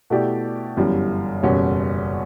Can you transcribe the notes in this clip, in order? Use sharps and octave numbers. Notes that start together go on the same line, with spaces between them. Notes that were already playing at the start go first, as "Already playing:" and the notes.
B2 A3 E4 G4 D5
G1 F#2 E3 G3
F#1 E2 B2 G3 C#4